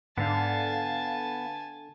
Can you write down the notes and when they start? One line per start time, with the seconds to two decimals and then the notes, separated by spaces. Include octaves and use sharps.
0.18 G#2 D3 B3 F5 G#5 A5